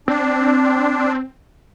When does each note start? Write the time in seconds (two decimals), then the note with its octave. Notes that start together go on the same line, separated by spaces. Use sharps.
0.08 C4 D4